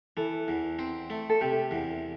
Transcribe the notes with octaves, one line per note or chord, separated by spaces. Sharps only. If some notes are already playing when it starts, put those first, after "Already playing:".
E3 A4
E2
C4
A3
A4
C3 G4
E2